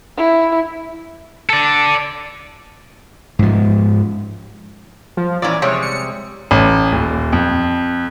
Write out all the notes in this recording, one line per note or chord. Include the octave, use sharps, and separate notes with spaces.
E4
A4 D5
G#2 F3
F3
A#2 E3 C#4 D5
C3 G3 G#3 C#5
C#7
A1
D#1
F2